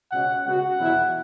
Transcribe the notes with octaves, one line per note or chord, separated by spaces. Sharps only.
C#2 B2 G#3 C#4 F#5
C#3 G#3 B3 F#4 F#5
E2 B2 F#3 E4